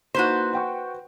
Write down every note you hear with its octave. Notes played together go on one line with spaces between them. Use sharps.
A#3 D#4 E4 F#4 B4 C5
F#5 G5 C#6